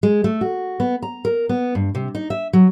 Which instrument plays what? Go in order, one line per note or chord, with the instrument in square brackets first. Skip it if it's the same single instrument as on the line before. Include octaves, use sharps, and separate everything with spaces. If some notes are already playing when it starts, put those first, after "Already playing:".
[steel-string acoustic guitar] G#3
A3
F#4
B3
A#5
A#4
B3
G2
C3
D#4
E5
F#3